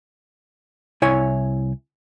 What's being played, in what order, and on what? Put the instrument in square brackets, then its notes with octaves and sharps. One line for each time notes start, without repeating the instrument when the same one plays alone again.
[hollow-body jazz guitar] C2 E4 C#5 G#5